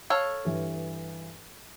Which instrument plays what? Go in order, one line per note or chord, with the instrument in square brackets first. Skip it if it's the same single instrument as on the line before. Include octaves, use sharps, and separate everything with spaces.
[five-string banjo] A4 C#5 F5
[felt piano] G2 E3